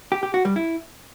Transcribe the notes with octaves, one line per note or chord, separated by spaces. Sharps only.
G4
G4
F#4
G3
E4